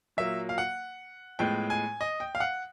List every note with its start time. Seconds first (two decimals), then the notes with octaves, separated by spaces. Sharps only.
0.17 A#2 F#3 A#3 E5
0.49 F5
0.58 F#5
1.39 A2 F3 G#3 B3 G5
1.70 G#5
2.01 D#5
2.20 G5
2.35 F5
2.40 F#5